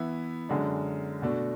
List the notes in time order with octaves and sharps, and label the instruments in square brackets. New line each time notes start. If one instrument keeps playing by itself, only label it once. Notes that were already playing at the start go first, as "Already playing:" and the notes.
Already playing: [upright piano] E3 B3 E4
F#2 D3 G#3 D4
B2 A3 D4 F#4